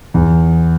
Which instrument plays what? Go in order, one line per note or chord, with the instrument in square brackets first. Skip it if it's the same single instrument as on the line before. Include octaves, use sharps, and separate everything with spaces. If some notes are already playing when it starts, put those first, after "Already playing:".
[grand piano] E2